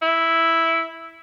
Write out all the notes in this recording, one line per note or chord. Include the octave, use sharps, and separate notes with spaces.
E4